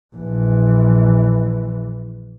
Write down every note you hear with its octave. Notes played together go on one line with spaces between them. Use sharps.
A#1 E3